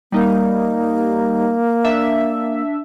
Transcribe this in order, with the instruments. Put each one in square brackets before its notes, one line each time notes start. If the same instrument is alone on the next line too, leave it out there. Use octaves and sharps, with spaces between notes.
[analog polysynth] G3 D#4 [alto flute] A#3
[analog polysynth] D4 E5